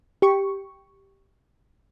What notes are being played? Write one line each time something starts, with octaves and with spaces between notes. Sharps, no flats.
G4 C#6